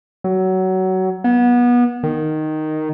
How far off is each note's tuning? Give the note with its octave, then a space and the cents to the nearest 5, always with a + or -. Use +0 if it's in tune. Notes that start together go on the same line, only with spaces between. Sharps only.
F#3 +20
B3 -25
D#3 -5